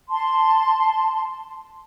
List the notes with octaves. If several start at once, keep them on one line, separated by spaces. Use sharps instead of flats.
A5 C6